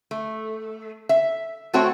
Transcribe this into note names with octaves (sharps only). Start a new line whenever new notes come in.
A3
E5
A3 C4 F#4 A4 C#5 G5